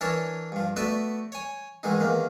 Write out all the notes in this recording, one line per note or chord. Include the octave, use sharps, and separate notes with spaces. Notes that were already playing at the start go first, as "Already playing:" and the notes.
E3 D4 A#4 C#5 A5
G2 F3
A3 B3 F#4 B4 D5 E5
C#5 G#5
G#2 D#3 E3 G#3 D#4
E2 D#3 A#3